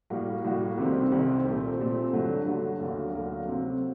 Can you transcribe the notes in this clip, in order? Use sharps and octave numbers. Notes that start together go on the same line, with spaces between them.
A2 G3 A#3 F#4
A2 G3 A#3 F#4
C2 C3 D#3 G3 C4
C2 C3 D#3 G3 C4
A#2 A3 C4 G4
A#2 A3 C4 G4
G2 D3 F#3 A3
G2 D3 F#3 A3
D2 D3 F#3 A#3
D2 D3 F#3 A#3
C3 F#3 C4